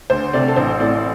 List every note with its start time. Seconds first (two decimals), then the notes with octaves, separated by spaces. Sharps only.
0.10 D2 C5
0.33 C3 A3 C4 D5
0.48 A4
0.56 A1 C5
0.79 A2 A3 C4 D5